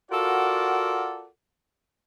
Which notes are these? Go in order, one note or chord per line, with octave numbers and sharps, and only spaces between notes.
F4 F#4 A4 A#4 D5 F#5